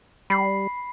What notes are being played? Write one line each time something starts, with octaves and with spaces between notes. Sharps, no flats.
G3 B5 C7